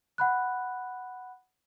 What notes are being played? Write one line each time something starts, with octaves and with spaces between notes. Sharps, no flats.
F#5 B5 F#6